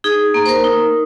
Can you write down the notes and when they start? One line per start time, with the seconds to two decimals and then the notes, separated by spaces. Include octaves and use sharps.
0.04 D#4 G#4
0.34 A#3
0.46 C5
0.49 A#4
0.64 D#4